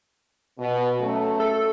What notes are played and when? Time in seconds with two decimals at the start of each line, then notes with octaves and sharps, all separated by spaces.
0.58 B2
1.01 F#3 A3 C#4
1.40 A4